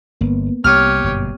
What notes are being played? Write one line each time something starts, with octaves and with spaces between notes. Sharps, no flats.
G1 A#3 B3
C2 G4 C#5 F6 D#7
G1 F#2 B2